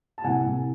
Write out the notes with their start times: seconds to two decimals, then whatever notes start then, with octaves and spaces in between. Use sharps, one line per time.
0.18 A5
0.24 C2 F#5 G#5
0.43 C2